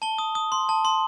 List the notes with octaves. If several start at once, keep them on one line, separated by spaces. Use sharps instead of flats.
A5 G7
D#6
D#6
C6
A5
C6